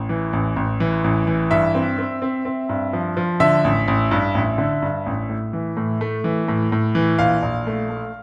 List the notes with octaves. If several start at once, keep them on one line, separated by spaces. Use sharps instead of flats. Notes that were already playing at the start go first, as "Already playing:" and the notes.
Already playing: A1
E3
A1
A1
E3
A1
E3
G2 E5
C4
C4
C4
C4
G2
F3
F3
D3 E5
A1
A1
G2
A1
D3
G2
A1
A2
E3
A2
A3
E3
A2
A2
E3
A#1 F5
A#1
A3
A3